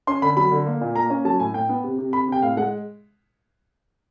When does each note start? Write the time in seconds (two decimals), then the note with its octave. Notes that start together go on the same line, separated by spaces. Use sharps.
0.07 C#4 C6
0.22 D3 B5
0.37 F#3 B5
0.51 D3
0.66 A#3
0.81 A#2
0.96 A#3 A#5
1.10 C#4
1.25 F#3 A5
1.40 A2 G#5
1.54 A2 G5
1.69 B3
1.84 C3
1.98 C3
2.13 C3 B5
2.28 C3 G5
2.42 A2 F5
2.57 G#3 F#5